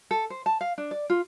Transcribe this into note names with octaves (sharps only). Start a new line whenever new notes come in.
A4
C5
A5
F5
D4
D5
F4